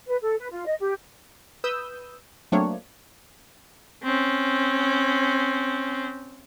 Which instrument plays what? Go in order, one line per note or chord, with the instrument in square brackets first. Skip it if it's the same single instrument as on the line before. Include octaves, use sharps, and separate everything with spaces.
[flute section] B4
A4
B4
F4
D#5
G4
[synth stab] B4 D#6 E6 G6
F#3 A3 A#3 C4 D4 C#5
[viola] C4 C#4